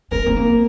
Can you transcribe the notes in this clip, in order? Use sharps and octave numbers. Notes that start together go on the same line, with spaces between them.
C4 A#4
C4
A#3